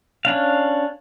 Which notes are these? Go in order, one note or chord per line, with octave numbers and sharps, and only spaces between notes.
C#4 D4 F5